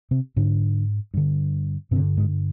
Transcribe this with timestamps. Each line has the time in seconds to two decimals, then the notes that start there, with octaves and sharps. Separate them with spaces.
0.11 C3 C4
0.36 G#2 D3 D4
1.14 G2 D3
1.91 G2 C3 C4
1.96 D3
2.17 G#2 G#3